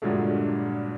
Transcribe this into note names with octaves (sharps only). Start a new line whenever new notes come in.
G2 A#2 D3 F#3 G#3 A3